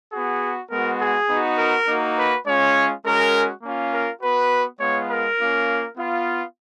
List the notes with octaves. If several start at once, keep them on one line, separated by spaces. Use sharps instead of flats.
B3 F#4 G#4
G#3 B3 F#4 A#4
G#4
B3 D#4 F#4
A#4
A#3 D#4 F#4
B4
G#3 C#4 F4 C#5
G#3 C#4 F#4 A#4
A#3 C#4 F4
A#4
B3 F#4 B4
G#3 B3 F4 C#5
A#4
A#3 C#4 F4
B3 F4